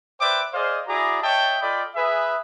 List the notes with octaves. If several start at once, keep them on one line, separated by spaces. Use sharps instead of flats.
B4 C5 D5 E5 G5 D6
G#4 C5 D5 D#5 F5
E4 F#4 G#4 D5 A#5 D6
C#5 D#5 E5 G5 A5
F4 A4 D5 D#5 G5 B5
G#4 B4 E5